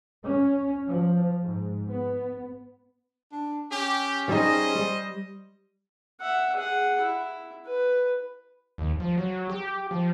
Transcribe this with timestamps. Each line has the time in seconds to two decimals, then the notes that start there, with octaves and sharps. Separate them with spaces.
0.24 C#4
0.88 F3
1.42 G#2
1.90 B3
3.32 D4
3.71 C#4 G4
4.29 G3 D#4 G#4 C5 D#5
4.75 G3
6.21 E5 F#5
6.56 G#4 F#5
7.00 E4
7.66 B4
8.78 D#2
9.00 F3
9.18 F#3
9.50 G4
9.91 F3